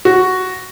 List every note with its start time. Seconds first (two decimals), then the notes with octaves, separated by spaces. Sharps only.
0.05 F#4